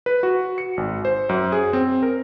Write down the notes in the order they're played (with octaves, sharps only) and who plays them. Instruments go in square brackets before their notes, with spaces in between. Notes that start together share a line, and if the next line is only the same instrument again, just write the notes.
[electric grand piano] B4
F#4
C#7
G#1
C5
F#2
G#4
C4
A#4